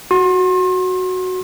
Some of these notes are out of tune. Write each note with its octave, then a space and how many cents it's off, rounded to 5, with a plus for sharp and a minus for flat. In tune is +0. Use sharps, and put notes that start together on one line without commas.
F#4 +0 C6 +35